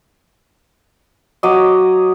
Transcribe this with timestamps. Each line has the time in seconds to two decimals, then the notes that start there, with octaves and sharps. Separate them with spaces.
1.43 F#3 C#5 D#5 D6